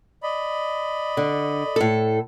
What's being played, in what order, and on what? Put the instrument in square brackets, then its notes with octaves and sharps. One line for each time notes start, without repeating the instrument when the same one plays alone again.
[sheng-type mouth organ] D5 D#5 B5
[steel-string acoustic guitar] D3
A2 A4